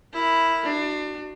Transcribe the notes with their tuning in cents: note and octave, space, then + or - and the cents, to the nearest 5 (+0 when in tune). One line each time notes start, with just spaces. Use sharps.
E4 +0 A#4 +0
D4 +30 F#4 +15